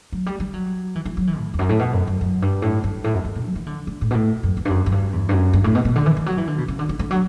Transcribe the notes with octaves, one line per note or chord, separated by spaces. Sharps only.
F#3
G3
G3
F#3
E3
E3
F#3
E3
A2
E2
F#2
A2
B2
F#2
F#2
F#2
G2
A2
G2
A2
F#2
E2
B2
F#3
E3
D3
D3
A2
B2
A2
F#2
E2
G2
F#2
F#2
G2
E2
G2
F#2
G2
A2
B2
B2
D3
E3
E3
F#3
E3
D3
B2
C#3
D3
D3
D3
F#3